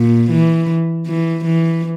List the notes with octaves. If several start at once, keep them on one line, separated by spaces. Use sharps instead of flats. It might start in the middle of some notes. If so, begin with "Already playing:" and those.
Already playing: A#2
E3
E3
E3